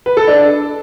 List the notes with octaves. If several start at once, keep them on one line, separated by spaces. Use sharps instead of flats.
B4
A4
D4